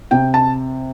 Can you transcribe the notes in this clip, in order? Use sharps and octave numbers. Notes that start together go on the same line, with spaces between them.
C3 G5
A5